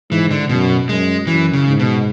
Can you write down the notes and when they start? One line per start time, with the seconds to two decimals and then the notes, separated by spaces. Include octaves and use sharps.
0.10 G#2 E3
0.31 D3
0.49 F#2 B2
0.89 F#2 G#3
1.27 F#2 E3
1.53 C#3
1.67 G#2
1.79 B2